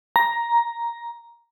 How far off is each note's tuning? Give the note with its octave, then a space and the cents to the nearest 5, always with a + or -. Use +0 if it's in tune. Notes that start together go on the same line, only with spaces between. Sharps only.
A#5 +10